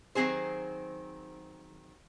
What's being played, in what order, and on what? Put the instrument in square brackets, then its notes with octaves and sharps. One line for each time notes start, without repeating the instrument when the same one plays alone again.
[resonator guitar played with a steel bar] D#3 F#3 C4 G#4 C5